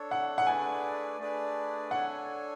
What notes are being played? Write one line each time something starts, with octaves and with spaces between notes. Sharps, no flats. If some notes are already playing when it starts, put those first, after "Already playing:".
Already playing: D4 A4 C#5
F#5
F#5
A3 D4 G#4 B4 D5 G#5
A3 D4 G#4 B4 D5
D4 A4 C#5 F#5 G#5